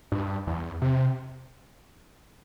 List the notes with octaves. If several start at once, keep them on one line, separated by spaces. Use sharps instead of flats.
G2
E2
C3